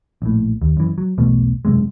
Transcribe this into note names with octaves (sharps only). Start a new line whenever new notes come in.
A#1 A2
D#2
F#2 E3
F#3
B1 E2 B2 A3
E1 F#2 C3 G#3